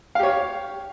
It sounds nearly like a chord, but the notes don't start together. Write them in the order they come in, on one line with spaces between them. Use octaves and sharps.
F5 G4 C#5